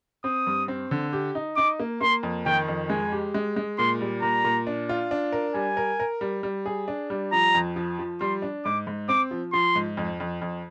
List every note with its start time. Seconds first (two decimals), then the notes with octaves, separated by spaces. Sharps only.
0.24 C4 D#6
0.47 G2
0.68 C4
0.91 D3
1.13 G4
1.35 D#4
1.57 D#4 D6
1.80 A#3
2.01 A#3 C6
2.23 F2
2.46 D#3 G5
2.68 F2
2.90 G#3 G#5
3.12 G4
3.34 G#3
3.56 G#3
3.79 A#2 C6
4.01 G3
4.22 A#2 A#5
4.44 A#2
4.67 D4
4.89 F4
5.11 D4
5.32 A#4
5.55 G3 G#5
5.77 A#4
6.00 A#4
6.21 G3
6.43 G3
6.66 G#4
6.88 D4
7.10 G3
7.32 F3 A#5
7.54 F2
7.76 F3
7.99 F3
8.21 G3 C6
8.42 D4
8.65 G#2 D6
8.87 G#2
9.09 C4 D6
9.31 F3
9.53 F3 C6
9.76 G#2
9.97 F2
10.20 F2
10.42 F2